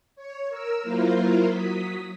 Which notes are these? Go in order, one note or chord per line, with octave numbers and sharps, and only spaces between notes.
C#5
A#4 E6
F#3 A#3 E4 F4 A#4 C5
F#3 D#6 B6